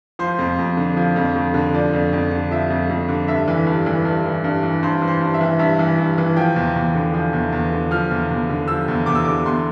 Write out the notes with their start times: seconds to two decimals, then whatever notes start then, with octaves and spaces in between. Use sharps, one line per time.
0.19 F3 C5
0.39 F2
0.59 F2
0.77 D3
0.97 F3
1.16 F2
1.36 F2
1.54 D3
1.74 F3 D5
1.93 F2
2.13 F2
2.31 D3
2.51 F3 E5
2.70 F2
2.89 F2
3.08 D3
3.28 G2 E5
3.48 E3
3.67 G2
3.86 E3
4.05 G2
4.25 E3
4.44 G2
4.63 E3
4.83 G2 C5
5.02 E3
5.08 C5
5.21 G2
5.34 E5
5.41 E3
5.59 G2 E5
5.79 E3
5.98 G2
6.18 E3
6.36 F3 G5
6.56 E2
6.75 E2
6.95 D3
7.14 F3
7.33 E2
7.52 E2
7.72 D3
7.91 F3 F6
8.11 E2
8.30 E2
8.49 D3
8.68 F3 E6
8.88 E2
9.06 E2 D6
9.15 E6
9.25 D3 D6
9.45 E2 C6